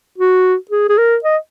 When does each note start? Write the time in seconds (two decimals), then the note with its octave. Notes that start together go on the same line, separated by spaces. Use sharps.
0.18 F#4
0.71 G#4
0.89 G#4
0.98 A#4
1.24 D#5